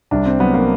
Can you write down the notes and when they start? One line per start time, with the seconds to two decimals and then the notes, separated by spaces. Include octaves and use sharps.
0.11 C2 D4
0.26 C4
0.40 F#3 B3
0.54 A#3